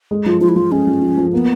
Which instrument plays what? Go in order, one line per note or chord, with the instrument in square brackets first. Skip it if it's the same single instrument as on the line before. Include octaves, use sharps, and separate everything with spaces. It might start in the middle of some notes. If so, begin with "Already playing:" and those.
[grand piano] G#3
[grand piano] F3 [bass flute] F4
[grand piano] F3 [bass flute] F4
[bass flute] E4
[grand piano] F3 [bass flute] F4
[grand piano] G#3 [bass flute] C#4
[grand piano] F3
F3
F3
[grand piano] A#3 [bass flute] B3